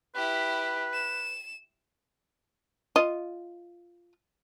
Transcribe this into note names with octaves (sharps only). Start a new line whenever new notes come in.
E4 G4 B4
E7
F4 D#5